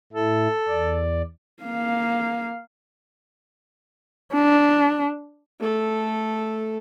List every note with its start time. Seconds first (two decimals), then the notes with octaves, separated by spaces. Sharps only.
0.13 A2 E4 A4
0.68 E2 D5
1.63 A#3 F5
4.33 D4
5.60 A3 A4